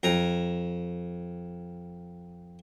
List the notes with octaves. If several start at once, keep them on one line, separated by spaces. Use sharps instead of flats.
F2 A#5